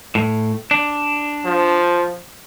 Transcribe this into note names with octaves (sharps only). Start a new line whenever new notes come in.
A2
D4
F3